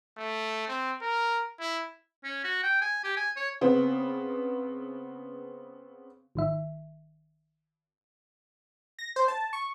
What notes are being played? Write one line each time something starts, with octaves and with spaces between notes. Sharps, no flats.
A3
C4
A#4
E4
C#4
F#4
G5
G#5
G4
G#5
C#5
C#3 B3 C4
G#1 D#3 E5
A#6
C5
A5
C#6